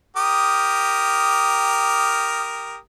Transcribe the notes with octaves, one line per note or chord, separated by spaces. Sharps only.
G4 A#4 D#6